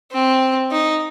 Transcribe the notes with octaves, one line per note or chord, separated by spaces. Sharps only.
C4
D#4